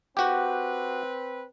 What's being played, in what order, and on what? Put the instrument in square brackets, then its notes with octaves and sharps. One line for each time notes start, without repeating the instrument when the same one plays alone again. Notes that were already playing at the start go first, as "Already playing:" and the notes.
[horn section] C4 B4 [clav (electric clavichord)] F#4 G4